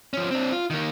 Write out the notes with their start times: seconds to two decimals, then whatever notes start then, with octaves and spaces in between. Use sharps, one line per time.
0.13 F3 C#4
0.31 C4 D4
0.52 F4
0.70 D#3 A#3